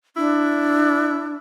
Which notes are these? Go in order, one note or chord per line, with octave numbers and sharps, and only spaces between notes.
D4 E4